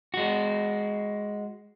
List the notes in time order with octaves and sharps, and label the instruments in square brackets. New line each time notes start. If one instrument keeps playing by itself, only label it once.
[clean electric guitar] G#3 F#4